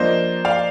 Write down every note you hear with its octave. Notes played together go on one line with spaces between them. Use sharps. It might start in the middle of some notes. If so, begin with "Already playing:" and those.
Already playing: F3 A#3 D4 C5 D#5
D5 F5